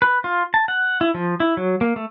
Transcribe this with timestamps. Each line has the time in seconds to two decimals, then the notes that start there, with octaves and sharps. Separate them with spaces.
0.02 B4
0.24 F4
0.54 A5
0.68 F#5
1.01 E4
1.14 F3
1.40 E4
1.57 F#3
1.81 A#3
1.96 A3